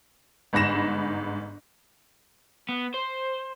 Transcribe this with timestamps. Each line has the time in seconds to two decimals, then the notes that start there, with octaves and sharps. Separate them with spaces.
0.53 G1 G#2 B5 A#6 E7
2.69 B3
2.94 C5